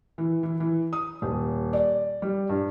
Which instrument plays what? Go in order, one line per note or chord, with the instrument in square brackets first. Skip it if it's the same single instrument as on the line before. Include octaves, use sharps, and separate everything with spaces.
[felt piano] E3
E3
E3
D#6
D#1
D5
G3
G2